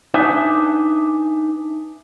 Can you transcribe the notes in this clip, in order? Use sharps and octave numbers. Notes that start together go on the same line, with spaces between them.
D4 D#4 B4 E5 G#5